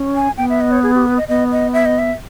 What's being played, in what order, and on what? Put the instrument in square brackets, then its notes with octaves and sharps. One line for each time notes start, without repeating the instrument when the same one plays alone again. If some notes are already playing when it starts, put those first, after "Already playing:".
Already playing: [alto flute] C#4
[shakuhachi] G#5
[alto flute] B3 [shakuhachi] G5
[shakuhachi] E5
D#5
C#5
G#4
G4
B4
D#5
[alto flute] B3 [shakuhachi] D#5
[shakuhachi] D#5
E5
D#5
E5